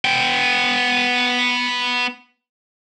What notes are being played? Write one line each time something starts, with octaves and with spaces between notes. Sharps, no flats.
B3 G5